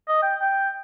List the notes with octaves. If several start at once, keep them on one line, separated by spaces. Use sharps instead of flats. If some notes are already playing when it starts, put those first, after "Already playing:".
D#5
G5
G5